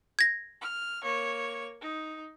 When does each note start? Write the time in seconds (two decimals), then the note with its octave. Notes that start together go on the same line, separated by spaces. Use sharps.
0.19 G#6 A#6
0.61 F6
1.03 A#3 C#5
1.81 D#4